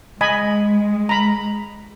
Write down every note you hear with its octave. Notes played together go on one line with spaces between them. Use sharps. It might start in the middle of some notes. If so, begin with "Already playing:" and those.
G#3 D#5 G#5 B5
A#5 B5